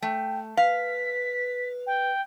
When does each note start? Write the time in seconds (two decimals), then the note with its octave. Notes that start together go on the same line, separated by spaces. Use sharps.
0.02 A3 G5
0.57 B4 F5 B6
1.87 G5